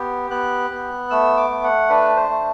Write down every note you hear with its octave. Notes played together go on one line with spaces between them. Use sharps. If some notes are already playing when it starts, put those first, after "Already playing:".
Already playing: B3 G4
B3 F#6
B3
A3 E6
D6
A3
F#5
D4 B4
C5
A3